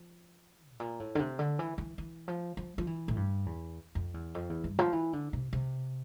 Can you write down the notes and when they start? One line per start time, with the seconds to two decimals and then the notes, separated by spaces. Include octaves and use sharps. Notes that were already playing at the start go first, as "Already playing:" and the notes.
Already playing: F3
0.72 A2
0.80 A#2
1.00 A2
1.15 D3
1.20 C3
1.39 D3
1.59 E3
1.78 E3
1.98 E3
2.28 F3
2.57 F3
2.78 F3
2.87 E3
3.08 A2
3.16 G2
3.46 E2
3.95 F2
4.14 E2
4.35 F2
4.50 E2
4.64 G2
4.79 F3
4.93 E3
5.13 D3
5.33 C3
5.53 C3